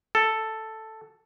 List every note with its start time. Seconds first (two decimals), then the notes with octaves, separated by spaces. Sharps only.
0.15 A4